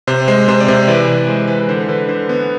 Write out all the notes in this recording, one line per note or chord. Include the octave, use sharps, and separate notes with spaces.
C3 C5
G#3 C5
C3 C5
D5
C3 C5
E3 B4 D5
C3
G#3 C5
E3 B4
B4
D3 C5
D3 B4
D3 C5
B3